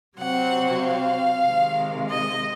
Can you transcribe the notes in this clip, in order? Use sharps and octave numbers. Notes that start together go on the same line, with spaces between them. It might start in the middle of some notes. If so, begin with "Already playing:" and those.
C3 F#3 C4 F#5
F5
C3 D#3 G#3
D#5